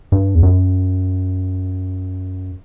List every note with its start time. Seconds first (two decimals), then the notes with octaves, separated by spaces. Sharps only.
0.12 G2
0.35 E2
0.43 F#2